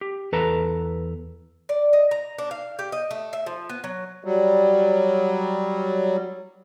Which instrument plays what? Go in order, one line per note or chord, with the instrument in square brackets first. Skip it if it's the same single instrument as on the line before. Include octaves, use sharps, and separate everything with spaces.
[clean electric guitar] G4
E2 A4 B4 A5 A#5
[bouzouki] D5
D#5
A#5
D4
F5
G4
D#5
A3
E5
F3
B3
F#3
[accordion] F#3 G3